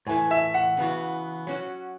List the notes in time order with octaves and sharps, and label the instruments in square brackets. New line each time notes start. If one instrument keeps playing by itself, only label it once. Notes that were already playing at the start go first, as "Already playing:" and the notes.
[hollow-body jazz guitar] A2 E3 A3 [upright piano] G#5
[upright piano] E5
F#5
[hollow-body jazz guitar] C#3 E3 B3 F#4
F#3 C#4 F#4